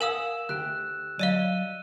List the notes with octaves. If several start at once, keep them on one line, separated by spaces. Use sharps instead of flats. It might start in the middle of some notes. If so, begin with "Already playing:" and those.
A#4 F5 F#5 G#5 D#6 E6 E7
D2 G4 G5 F#6
F#3 D5 D#5 F5 D#7 G7